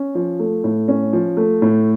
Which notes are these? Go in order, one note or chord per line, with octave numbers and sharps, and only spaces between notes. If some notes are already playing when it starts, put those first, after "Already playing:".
Already playing: C#4
F3
A3
A2
C#4
F3
A3
A2